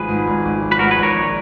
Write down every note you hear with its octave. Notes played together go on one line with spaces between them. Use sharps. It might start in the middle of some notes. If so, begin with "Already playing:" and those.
Already playing: G#1 F3 G#4 B4
G#2
G#1
G#1
F3
B4
G#2 F#4 A#4
G#4 B4
G#1
A#4 C#5
A#1